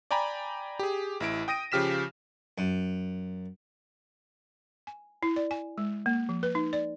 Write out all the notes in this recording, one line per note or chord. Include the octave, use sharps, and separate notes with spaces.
D5 G5 G#5 A#5 B5
G4 G#4
A1 E4 D7
G5 D#6 A#6 D7 D#7
C#3 F3 G4 F6 B6 E7
F#2
G#5
E4
D5
G#5
G#3
A#3
F3
B4
D#4
D5